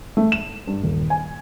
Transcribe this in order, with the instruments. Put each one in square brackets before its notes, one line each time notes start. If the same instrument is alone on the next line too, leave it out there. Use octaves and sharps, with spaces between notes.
[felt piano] A3
E7
G2
D#1
G#5